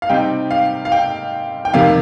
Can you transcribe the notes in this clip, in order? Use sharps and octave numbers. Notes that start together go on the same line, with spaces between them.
F5
C3 G3 C4 D#4 G5
F5
F5
G5
G5
F2 C3 D#3 A#3 F5